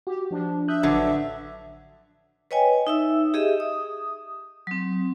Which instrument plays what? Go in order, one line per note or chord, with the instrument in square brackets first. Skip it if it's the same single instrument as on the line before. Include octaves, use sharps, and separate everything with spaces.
[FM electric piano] F#4 [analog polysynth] G4
[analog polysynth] F3 D4
[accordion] E5 [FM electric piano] D#6 F#6 G6
[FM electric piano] A1 B4 [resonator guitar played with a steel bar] D3 F#3
[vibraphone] B4 C#5 D#5 G5 G#5
D#4 E5 E6
G4 G#4 D#5 E5
D#6
F#3 C4